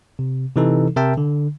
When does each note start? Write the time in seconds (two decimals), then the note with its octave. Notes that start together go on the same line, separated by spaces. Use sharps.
0.19 C3
0.56 C3 E3 D#4 A4
0.96 C3 A#4 E5 G5 A5
1.17 D3